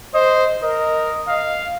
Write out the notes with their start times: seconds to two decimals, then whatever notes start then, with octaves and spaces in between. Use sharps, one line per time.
0.14 C5 D#5
0.62 A#4 D#5
1.27 F5